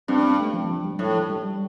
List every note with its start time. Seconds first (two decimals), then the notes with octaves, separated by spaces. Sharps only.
0.08 G2 C4
0.23 C4
0.39 A3
0.54 F3
0.69 F3
0.84 G3
0.99 A2 F3
1.30 G3